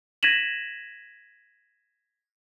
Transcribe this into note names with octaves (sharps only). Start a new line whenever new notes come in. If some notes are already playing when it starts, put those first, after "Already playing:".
G#6 A#6 B6 D#7 E7 F#7